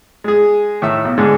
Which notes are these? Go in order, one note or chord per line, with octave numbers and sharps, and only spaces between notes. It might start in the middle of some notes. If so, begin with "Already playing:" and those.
G#3 G#4
A2 D#3 E5 E6
B1
G#2 D3 G#3